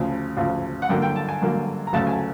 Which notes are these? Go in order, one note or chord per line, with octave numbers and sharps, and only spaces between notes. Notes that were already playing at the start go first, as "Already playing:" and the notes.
Already playing: D2 C#3 F3
D2 C#3 F3
F#5
G2 D3 F#3 A#3 G5
G5
A5
G#5
G2 D3 F#3 A#3
A#5
D2 C#3 F#3 A3 A5
G#5
A5